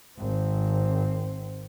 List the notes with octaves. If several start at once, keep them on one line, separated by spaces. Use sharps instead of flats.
G#1 C4